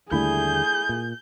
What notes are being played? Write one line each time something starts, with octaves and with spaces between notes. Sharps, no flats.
D#2 D3 G3 A3 E4 G#4 G6
A#2